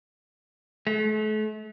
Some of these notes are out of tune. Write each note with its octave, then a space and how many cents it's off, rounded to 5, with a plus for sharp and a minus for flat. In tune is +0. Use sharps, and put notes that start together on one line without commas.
A3 -40